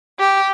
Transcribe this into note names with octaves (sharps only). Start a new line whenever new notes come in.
G4